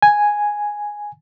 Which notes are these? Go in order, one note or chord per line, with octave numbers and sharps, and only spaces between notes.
G#5